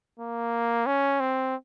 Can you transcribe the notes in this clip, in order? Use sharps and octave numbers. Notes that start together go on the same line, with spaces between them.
A#3
C#4
C4